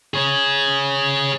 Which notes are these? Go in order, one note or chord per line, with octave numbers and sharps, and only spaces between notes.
G#4 C#5